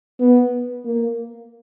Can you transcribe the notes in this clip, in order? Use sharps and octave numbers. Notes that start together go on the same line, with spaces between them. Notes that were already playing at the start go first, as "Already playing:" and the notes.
B3
A#3